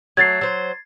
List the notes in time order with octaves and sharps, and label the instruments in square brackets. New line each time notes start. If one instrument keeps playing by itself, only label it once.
[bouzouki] F#3 A3 [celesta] G#6 A6 C7
[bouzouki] F#3 C5